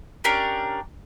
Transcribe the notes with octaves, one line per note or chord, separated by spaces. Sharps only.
C#4 D4 G4 A#4